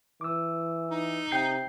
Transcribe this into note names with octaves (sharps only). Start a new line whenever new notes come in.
E3 D6 E6
D#4
C3 G5 G6 C7